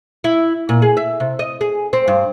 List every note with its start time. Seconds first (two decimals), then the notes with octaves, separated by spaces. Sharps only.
0.24 E4
0.69 A#2
0.82 G#4
0.97 E5
1.20 C3
1.39 D#5
1.61 G#4
1.93 C4
2.08 G2